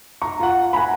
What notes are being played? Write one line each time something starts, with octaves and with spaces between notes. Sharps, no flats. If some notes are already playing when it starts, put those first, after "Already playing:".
A#5 C#6
F4 F#5
F#5 G#5 A#5 B5